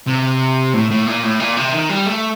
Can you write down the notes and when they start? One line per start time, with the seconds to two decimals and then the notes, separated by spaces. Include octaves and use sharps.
0.07 C3
0.74 A2
0.91 A2
1.06 A#2
1.23 A2
1.40 A#2
1.57 C3
1.73 D#3
1.90 G3
2.06 A3